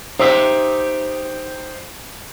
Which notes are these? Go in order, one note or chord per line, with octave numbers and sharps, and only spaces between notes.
D#4 G4 C5 E5